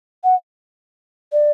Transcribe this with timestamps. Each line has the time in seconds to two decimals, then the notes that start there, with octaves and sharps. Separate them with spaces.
0.24 F#5
1.32 D5